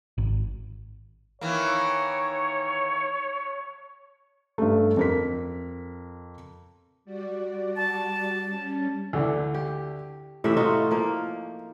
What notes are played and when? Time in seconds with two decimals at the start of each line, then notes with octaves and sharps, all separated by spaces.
0.18 G#1
1.41 D#3 E3 A#3 C#5
4.58 G2 A3
4.97 F2 A#4 B6
7.05 G3 F#4 D5
7.77 A5
8.45 G3 C#4
9.13 D2 D3 E3
9.54 G4
10.44 A2 C3 E3 E5
10.57 D#4 F4 F#4
10.91 F3 A#3